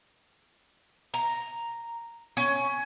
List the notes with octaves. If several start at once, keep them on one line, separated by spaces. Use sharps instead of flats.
A#5
C#4